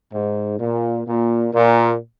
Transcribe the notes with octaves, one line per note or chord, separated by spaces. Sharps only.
G#2
A#2
A#2
A#2